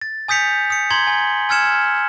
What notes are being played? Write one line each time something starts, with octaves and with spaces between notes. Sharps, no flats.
A6
G#5 D#6 G6 B6 C#7 F7
D#6 C#7
A#5 C6 G#6 F#7 G7
G#5
G#5 E6 F6 G#6 C#7 E7